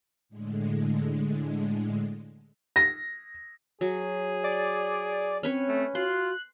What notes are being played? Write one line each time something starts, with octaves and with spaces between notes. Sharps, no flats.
A2 D3 G#3
A#6
F#3 G#4
D5
C4 C#4 B4 C#5
A3
F4 F#4 C6 F#6